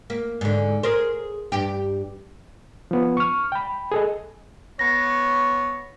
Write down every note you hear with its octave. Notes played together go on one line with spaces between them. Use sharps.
A#3
G#2 D3
G#4 A#4 C5
G2 G4
F3 B3
C#6 F6
G5 B5
G#4 A4 D#5
B3 C#5 A#6